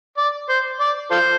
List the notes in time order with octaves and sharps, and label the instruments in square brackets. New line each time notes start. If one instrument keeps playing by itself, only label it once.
[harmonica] D5
C5
D5
F4 A4 C5